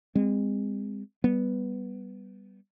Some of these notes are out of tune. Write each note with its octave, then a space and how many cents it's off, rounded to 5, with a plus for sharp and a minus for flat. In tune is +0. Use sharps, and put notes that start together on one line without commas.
G#3 -35 C4 -15
G3 +0 B3 +0